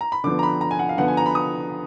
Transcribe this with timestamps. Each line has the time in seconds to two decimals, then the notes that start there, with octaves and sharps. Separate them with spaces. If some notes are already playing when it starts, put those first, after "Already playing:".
0.01 A#5
0.12 B5
0.24 D3 F3 B3 D6
0.39 A#5
0.43 B5
0.61 A#5
0.71 G#5
0.79 F#5
0.89 F5
0.98 D3 F3 B3 F#5
1.08 G#5
1.17 A#5
1.26 B5
1.35 D#6